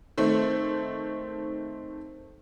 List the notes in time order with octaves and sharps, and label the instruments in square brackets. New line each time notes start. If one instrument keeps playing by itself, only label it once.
[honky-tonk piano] D#3 A3 C4